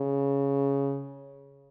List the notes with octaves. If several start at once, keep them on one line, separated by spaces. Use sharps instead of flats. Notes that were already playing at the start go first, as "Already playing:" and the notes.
Already playing: C#3